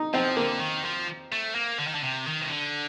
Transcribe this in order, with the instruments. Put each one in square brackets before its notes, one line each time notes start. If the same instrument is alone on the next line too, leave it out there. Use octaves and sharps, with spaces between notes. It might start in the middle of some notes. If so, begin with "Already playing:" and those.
Already playing: [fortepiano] D#4
[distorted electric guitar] F3 [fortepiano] C4
[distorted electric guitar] D3 [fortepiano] A#3
[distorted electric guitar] D#3
F3
A3
A#3
D3
D#3
D3
C3
D#3
C3
D3